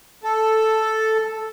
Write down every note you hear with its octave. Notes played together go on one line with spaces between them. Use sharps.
A4